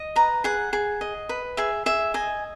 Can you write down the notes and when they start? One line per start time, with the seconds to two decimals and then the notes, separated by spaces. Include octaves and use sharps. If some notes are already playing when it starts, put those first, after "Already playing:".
Already playing: D#5
0.16 B4 A#5
0.44 G#4 F#5
0.73 G#4
1.01 D#5
1.29 B4
1.57 G#4 E5
1.86 G#4 E5
2.14 D#5 G#5